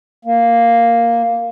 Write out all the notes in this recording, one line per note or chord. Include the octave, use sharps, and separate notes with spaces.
A#3